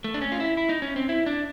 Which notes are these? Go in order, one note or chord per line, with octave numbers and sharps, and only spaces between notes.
A3
D4
C#4
F4
E4
E4
D#4
C#4
C4
E4
D4